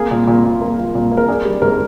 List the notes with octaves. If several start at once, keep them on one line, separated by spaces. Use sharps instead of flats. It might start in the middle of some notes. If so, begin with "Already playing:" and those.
Already playing: A#3 G#4
A#2
A#2
F4
A#3
F4
A#2
A#3
A#4
D4 G#4
G3
G#2 A#4